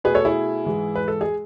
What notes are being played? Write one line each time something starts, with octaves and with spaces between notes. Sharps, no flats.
B2 A3 G#4 B4
A4 C#5
E4 G#4
G#2 E3 G#3
B4
A4
G#3 G#4